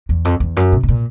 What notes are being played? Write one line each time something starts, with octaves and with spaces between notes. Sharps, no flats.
E2
F2
E2
F#2
B2
B2
A#2